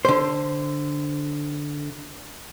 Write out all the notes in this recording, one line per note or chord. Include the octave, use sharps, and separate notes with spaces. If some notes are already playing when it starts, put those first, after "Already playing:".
D3 C5